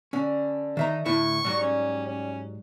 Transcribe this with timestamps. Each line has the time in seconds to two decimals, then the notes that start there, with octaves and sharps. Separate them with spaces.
0.13 D3 C#4
0.77 D#3 D#4 E5 A#5
1.05 D2 A2 E4 C#6
1.44 G#2 F#3 G3
1.61 C#4
2.07 C#4